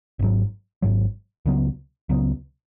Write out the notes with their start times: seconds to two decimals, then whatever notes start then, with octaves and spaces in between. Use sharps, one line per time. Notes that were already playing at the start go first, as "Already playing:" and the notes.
0.19 G#1 G#2 F#3
0.82 G#1 G#2 F#3
1.46 C#2 C#3 F#3 B3
2.09 C#2 C#3 F#3 B3